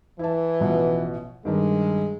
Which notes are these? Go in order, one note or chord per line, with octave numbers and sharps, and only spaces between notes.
E3 E4 A5
A1 B2 F3
G2 D#3 G#3 D4